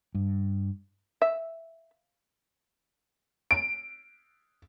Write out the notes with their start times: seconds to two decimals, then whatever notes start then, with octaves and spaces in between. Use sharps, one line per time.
0.15 G2
1.22 E5
3.51 D7